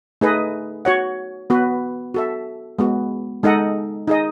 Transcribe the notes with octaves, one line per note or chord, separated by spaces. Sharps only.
A3 D#4 G#4 B4 D#5
F#4 C#5 F#5
B3 F#4 B4
F#4 A4 E5
G#3 B3 F#4
G#3 D#4 A4 D#5 F#5
D#4 G#4 D#5